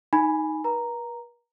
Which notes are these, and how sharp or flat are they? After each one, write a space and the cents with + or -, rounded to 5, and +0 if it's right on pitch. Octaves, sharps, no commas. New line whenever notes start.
D#4 +0 G#5 +0 B5 +0
B4 -45 A#5 +0